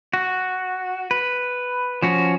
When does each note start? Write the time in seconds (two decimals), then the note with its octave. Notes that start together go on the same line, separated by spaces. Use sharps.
0.14 F#4
1.11 B4
2.02 F3 C#4 F#4